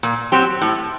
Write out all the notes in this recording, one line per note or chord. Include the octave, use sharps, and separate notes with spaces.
A#2
F#3 C4 G4
A2